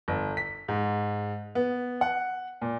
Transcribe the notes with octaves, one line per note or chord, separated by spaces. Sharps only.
G1
B6
G#2
B3
F#5
A#2